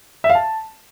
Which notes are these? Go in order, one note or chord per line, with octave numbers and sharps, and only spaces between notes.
E5
F5
A5